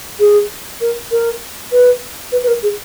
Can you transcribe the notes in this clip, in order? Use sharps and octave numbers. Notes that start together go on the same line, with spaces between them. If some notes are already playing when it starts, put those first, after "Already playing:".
G#4
A#4
A#4
B4
B4
B4
A#4
G#4